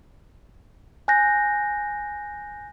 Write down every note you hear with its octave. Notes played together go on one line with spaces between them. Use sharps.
G#5 F#6 G6 A#6